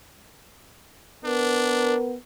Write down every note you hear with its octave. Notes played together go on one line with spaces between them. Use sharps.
B3 D4 A#4